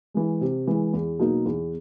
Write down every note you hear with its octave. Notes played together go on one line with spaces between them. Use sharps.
E3 G#3
C3
E3 G#3
E2
B2 F#3 A#3 D#4
E2